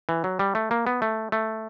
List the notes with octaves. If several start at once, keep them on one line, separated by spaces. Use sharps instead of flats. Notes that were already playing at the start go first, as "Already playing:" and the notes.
E3
F#3
G3
A3
A#3
B3
A3
A3